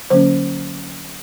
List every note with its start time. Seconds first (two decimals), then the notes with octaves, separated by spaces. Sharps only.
0.10 D3 F#3 A#3 C#4 C5